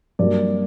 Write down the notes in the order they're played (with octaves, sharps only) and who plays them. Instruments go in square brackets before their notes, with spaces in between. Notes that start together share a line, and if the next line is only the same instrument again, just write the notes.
[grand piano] G2 F#3 A#3 D5